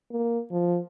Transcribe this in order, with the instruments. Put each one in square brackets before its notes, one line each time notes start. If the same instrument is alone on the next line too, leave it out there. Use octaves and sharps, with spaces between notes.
[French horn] A#3
F3